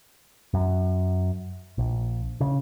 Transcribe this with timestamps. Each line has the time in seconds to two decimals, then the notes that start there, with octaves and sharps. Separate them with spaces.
0.54 F#2
1.78 A#1
2.41 C#3